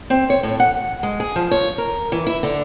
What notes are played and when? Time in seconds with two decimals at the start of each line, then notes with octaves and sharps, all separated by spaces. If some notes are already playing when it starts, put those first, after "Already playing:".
0.10 C4
0.30 C#5
0.43 A2
0.60 F#5
1.03 G#3
1.20 G#4
1.36 F3
1.51 C#5
1.78 A#4
2.12 E3
2.26 E4
2.43 D3